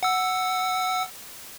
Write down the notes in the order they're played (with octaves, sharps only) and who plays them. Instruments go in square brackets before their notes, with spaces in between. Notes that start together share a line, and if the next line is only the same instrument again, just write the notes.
[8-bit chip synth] F#5 E6